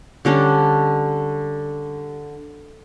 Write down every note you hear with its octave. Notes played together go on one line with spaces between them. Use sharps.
D3 G3 C#4 D4